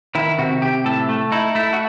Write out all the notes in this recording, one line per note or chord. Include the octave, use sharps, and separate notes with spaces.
D#3 E4
C3 F#4
C3 G4
A2 A4
A3
D#4 E4
A3 E4
F#4